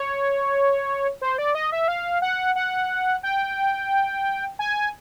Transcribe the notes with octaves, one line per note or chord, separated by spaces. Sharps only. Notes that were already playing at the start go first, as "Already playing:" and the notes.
Already playing: C#5
C5
D5
D#5
E5
F5
F#5
F#5
G5
G#5